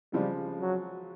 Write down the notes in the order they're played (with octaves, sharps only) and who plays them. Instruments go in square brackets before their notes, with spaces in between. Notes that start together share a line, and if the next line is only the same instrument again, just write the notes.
[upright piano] C#3 F3 G#3 [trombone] G3
[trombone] F#3